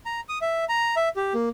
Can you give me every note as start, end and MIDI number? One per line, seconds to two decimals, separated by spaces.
0.06 0.20 82
0.29 0.38 87
0.41 0.65 76
0.69 0.95 82
0.96 1.09 76
1.16 1.33 67
1.34 1.49 58